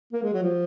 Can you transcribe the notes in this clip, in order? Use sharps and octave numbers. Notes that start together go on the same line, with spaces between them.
A#3
G#3
F#3
F3